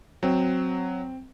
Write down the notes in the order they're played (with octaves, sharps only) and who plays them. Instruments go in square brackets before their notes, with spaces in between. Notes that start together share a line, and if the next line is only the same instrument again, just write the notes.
[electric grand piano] F#3 [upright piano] C4